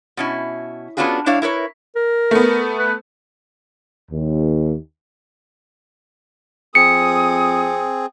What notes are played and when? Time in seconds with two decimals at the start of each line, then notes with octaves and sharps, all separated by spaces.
0.17 B2 C#4 E4
0.97 B3 C#4 D4 F4 F#4 G#4
1.26 G2 D4 E4 C#5 F5
1.42 E4 A#4 B4 C#5
1.96 A#4
2.31 A3 B3
2.78 B4
4.11 D#2
6.75 F2 C4 G#4 D#6 C#7